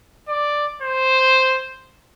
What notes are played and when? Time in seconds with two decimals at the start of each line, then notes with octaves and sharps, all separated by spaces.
0.28 D5
0.82 C5